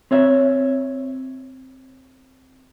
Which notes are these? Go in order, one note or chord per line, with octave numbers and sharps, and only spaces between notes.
C4 C#5 E5